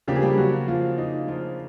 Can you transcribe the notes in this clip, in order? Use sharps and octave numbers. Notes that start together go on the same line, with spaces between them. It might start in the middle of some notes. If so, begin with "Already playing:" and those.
C#3 F3 A#3 D4 G4
G#4
G3 G4
F#3 F#4
F3 F4
D#4
F3 F4